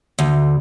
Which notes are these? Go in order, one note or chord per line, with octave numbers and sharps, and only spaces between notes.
D2